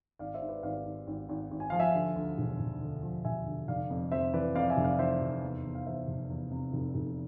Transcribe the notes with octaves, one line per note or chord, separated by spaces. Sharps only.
G#1 D5 F5
C5 E5
G#2
B4 D5
G#1 D5 F5
G#1
G#1
G#1
G#1
G#5
F3 F5
E5 G#5
D3
D2
E1
E1
D2
F3
E1 E5 G#5
D2
F1 D5 F5
F2
F2 C5 E5
E3 B4 D5
F2 D5 F5
E5 G#5
F1
D5 F5
E3 C5 E5
F1
E2
E2
F5
E2 C5 E5
F1
E2
C3
F1
F1